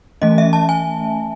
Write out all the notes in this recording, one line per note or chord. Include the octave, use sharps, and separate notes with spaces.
E3 A3 C#4 D#5
E5
A5
G#5